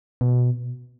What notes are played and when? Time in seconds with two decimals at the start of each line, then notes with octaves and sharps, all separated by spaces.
0.21 B2